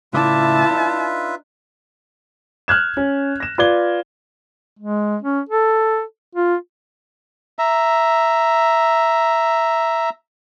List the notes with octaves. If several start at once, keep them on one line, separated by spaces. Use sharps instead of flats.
A2 C#3 E4 F4 B4 D5 E5 A5
D4 D#4
F6 F#6 G#6 E7
C#4
A#6 E7
F4 B4 D5 G#6 G7
G#3
C#4
A4
F4
E5 A#5